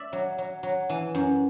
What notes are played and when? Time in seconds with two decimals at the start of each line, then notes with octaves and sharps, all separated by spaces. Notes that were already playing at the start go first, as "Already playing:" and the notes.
Already playing: D5 E5
0.13 F#3
0.38 F#3
0.63 F#3
0.90 E3
1.15 F#2